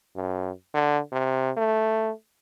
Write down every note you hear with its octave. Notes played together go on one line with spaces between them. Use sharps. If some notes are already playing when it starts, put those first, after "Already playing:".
F#2
D3
C3
A3